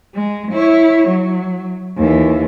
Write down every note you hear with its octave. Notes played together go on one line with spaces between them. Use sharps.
G#3
E4 C#5
F#3
D#2 E3